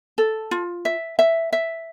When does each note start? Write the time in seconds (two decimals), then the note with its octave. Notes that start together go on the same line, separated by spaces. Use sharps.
0.18 A4
0.51 F4
0.85 E5
1.19 E5
1.53 E5